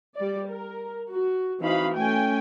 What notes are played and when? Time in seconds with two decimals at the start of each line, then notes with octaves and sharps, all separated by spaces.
0.16 G3 D5
0.50 A#4
1.11 F#4
1.61 E3 C4 D#4 F#4 F5 B5
1.97 A3 C#4 G5 G#5